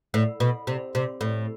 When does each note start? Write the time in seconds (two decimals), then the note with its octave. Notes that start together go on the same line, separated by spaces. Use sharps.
0.14 A2
0.40 B2
0.67 C3
0.95 C3
1.21 A2